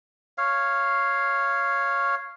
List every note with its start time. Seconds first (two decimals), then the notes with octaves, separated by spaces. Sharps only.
0.38 C#5 F5